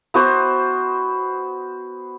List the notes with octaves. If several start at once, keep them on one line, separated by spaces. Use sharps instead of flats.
B3 F#4 C5